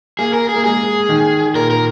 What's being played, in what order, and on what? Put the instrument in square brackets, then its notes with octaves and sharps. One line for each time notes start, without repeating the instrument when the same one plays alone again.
[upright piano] A#3 [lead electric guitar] G#4
[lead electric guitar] A#4
G#4
[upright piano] A#3
[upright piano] G#3 [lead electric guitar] G#4
[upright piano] D#3
[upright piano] A#2 [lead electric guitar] A#4
[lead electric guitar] A#4